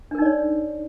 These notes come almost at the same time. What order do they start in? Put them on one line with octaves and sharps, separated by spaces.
D4 A#4 D#4 D5 C#5